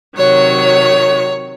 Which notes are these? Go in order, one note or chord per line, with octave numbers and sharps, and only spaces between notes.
C3 D#3 F#3 C#5